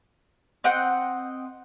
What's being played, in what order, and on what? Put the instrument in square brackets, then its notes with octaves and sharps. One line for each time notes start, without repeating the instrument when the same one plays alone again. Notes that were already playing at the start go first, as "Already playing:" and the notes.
[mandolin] C4 D#5 F#5 G5